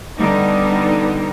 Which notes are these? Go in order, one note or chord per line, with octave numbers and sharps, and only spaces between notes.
D3 G3 B3 D#4